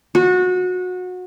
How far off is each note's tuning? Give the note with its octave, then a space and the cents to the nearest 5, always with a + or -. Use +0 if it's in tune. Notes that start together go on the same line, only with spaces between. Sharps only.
F#4 -25